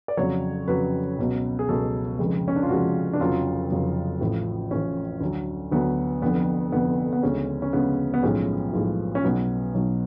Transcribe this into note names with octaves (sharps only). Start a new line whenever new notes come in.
D5
F2 C#3 F#3 C#5
F2 C#3 F#3 B4
C#2 B2 F#3
G#4
C#2 B2 F#3 A4
F1 F2 C#3 G#3
C#4
D4
F4
F1 F2 C#3 G#3 F#4
D4
F1 F2 C#3 F#3 F4
F1 F2 C#3 F#3
A1 A2 F3
A1 A2 F3 C#4
D2 D3 F#3
D2 D3 F#3 B3
F1 F2 D3 B3
F1 F2 D3 B3
B3
D2 C#3 G#3 C#4
C#4
D2 C#3 G#3 B3
B3
B1 A2 F3 G#3 C#4
B1 A2 F3 G#3
C#4
B1 B2 F#3 B3
B1 B2 F#3